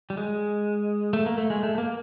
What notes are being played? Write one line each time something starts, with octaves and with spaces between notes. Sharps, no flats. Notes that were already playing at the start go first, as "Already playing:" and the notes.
G3
G#3
A3
A#3
A3
G#3
A3
A3
A#3